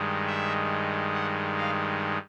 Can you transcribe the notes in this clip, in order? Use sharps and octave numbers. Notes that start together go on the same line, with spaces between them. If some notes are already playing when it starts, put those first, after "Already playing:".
Already playing: G2 D#3 G#3
E5
F#5
F5